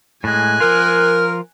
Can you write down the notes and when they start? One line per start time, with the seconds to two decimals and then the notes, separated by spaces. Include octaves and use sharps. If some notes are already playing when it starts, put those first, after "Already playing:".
0.24 A2 G#3 G#5 F#6
0.60 F3 F4 A#4